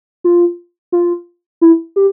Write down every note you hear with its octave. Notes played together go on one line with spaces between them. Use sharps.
F4
F4
E4
G4